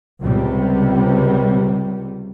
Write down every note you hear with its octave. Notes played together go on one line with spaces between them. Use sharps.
C#2 C3 G3